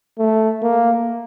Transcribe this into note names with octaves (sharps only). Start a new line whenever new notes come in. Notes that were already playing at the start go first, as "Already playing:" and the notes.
A3
A#3